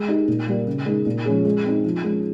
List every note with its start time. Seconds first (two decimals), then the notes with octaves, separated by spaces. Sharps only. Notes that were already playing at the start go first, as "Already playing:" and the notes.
Already playing: G#3
0.08 D#4 G4
0.28 A#2
0.47 G3 A#3
0.66 C#3
0.86 G#3 D#4 G#4
1.06 A#2
1.25 F3 G#3 C#4 G#4
1.45 G#3
1.65 C4 D#4
1.84 F3
2.04 G#3 C#4